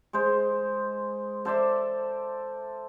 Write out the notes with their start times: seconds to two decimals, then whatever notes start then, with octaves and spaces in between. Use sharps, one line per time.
0.13 G#3 C5
1.45 A4 C5 D5 E5